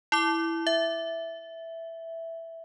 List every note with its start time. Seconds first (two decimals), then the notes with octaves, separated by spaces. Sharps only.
0.12 E4 D6
0.67 E5